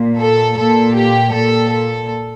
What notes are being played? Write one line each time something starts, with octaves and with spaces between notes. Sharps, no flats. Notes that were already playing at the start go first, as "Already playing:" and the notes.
Already playing: A#2
A4
A#2 A4
G4
A#2 A4
A4